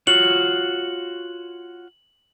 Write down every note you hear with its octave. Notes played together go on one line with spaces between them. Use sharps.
F4 F#4 C#5 F#7